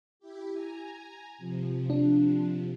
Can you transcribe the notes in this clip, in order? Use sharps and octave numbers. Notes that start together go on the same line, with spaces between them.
E4 G4
G#5 A#5
C3 F3
D4